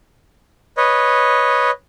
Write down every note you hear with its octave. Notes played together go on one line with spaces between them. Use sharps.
B4 C#5 D#5